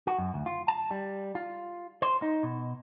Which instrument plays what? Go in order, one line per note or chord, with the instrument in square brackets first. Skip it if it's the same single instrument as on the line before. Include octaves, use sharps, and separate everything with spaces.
[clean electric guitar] F#4
F#2
D2
F4
A5
G3
F4
C5
D#4
B2